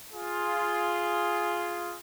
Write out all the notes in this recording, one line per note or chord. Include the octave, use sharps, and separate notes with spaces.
F4 G#4